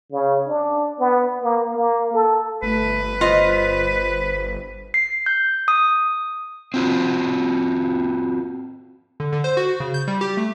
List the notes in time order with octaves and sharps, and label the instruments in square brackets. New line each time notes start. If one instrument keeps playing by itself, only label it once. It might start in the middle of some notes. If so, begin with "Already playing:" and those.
[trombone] C#3
D4
B3
A#3
A#3
A4
[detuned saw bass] G1 [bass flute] A3 [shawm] B4
[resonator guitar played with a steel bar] F4 D#5 [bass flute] C5
[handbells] C7
G6
D#6
[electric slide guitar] C4 F4 F#4
[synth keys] D3
D3
C5
F#4
C#3
G6
G3
G4
A3